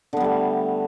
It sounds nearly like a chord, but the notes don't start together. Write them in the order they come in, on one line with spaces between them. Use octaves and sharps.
D3 B3 G3 A3